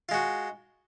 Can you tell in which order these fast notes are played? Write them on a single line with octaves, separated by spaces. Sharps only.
F4 G#3 F#4